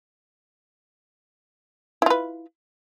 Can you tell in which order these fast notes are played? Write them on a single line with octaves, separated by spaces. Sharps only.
E4 F4 B4